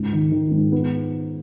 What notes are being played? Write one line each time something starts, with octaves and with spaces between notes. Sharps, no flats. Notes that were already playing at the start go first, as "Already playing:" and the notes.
Already playing: C#2 G#2
D#3
D#3
G#2
B3